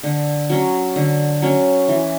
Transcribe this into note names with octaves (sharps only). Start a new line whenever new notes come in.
D3
F#3 C#4
D3
F#3 C#4
E3